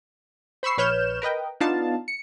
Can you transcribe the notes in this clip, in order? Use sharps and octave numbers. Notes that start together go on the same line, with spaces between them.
C5 B5 C#6 E6 C7
A#1 B4 C#5 F6 G6 E7
A#4 B4 D#5 G5
B3 D4 D#4 F4 F5 A5
C#7